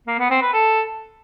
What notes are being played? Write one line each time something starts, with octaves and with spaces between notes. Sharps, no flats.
A#3
B3
C4
B4
A4